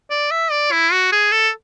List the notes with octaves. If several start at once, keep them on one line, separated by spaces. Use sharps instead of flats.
D5
E5
D5
E4
F#4
G#4
A4